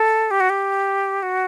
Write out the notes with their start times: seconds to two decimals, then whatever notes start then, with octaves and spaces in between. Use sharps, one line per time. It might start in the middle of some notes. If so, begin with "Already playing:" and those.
Already playing: A4
0.31 G4
0.40 F#4
0.49 G4
1.22 F#4